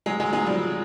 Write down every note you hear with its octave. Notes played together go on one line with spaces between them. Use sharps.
F#3 G#3
F#3 G#3
F#3 G#3
F3 G3